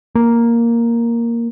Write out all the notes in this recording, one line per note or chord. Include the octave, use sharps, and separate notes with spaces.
A#3